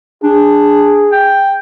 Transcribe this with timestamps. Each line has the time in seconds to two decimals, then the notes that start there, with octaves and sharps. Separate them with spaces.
0.23 D4 G#4
1.12 G5